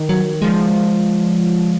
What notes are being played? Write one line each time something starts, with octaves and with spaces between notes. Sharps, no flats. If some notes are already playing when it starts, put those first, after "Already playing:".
Already playing: D#3
F#3
F3 G#3